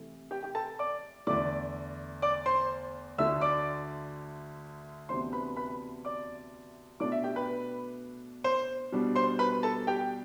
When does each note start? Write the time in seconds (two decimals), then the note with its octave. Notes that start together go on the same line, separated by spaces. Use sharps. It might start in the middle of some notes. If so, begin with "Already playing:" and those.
Already playing: C3 E3 A3
0.31 G4 G5
0.43 G4 G5
0.55 A4 A5
0.79 D5 D6
1.27 E2 D3 A3 D5 D6
2.22 D5 D6
2.46 C5 C6
3.18 D2 D3 A3 E5 E6
3.41 D5 D6
5.09 D2 C3 E3 B3 D4 C5 C6
5.33 B4 B5
5.56 B4 B5
6.05 D5 D6
7.00 B2 A3 D4 D5 D6
7.12 E5
7.24 G4 G5
7.36 B4 B5
8.44 C5 C6
8.92 B2 G3 D4
9.15 C5 C6
9.39 B4 B5
9.63 A4 A5
9.87 G4 G5